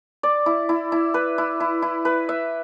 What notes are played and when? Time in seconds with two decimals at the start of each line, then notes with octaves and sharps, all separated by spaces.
0.23 D5
0.46 E4
0.69 E4
0.92 E4
1.14 B4
1.38 E4
1.60 E4
1.82 E4
2.05 B4
2.29 E5